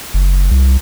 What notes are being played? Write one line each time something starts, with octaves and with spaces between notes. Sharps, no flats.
F#1
C2